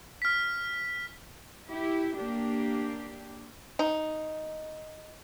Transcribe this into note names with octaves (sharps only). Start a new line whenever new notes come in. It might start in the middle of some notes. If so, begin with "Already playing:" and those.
F6 B6
E4 G4
A#3 D4 G4
D#4